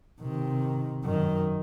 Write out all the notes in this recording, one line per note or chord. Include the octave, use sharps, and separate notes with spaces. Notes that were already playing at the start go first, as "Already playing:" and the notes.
C3 D#3
F#2 D#3